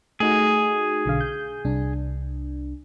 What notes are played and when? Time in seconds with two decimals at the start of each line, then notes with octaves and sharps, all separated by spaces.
0.20 A3 D#4 F#4 G#4
1.06 B1 D3 F5
1.21 G6
1.65 C2 D4